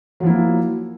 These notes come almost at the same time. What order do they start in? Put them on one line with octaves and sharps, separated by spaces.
F#3 F3 E4 A#3